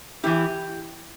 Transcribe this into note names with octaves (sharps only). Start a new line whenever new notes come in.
E2 E3 A#3 E4 G4